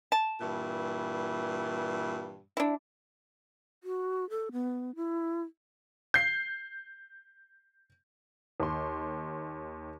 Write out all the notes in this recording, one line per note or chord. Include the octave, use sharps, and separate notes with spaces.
A5
G2 A#2 E3
D4 E4
F#4
A4
B3
E4
G6 C7
D#2 C6